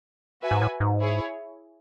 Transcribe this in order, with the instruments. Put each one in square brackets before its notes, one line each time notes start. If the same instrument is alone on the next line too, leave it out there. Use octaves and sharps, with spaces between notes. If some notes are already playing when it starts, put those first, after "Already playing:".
[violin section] F#4 B4 E5 G#5
[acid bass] G#2
A2
G#2
[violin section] E4 G#4 C#5